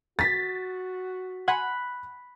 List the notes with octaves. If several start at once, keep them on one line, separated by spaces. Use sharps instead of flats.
F#4 A6 B6
F#5 G#5 B5 C6 F#6